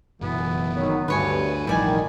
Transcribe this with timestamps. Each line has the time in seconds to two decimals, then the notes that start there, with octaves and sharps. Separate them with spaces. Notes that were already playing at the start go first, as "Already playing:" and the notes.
0.21 F#1 B2 E3 B3
0.74 D#3 F#3 B3
1.08 D2 G2 D3 B4 C#5 G#5
1.67 E1 A1 D#3 F3 G3 E4 D5 G#5